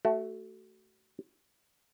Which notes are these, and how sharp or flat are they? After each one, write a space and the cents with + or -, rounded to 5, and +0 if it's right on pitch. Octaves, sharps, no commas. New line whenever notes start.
A3 +0 F#4 +30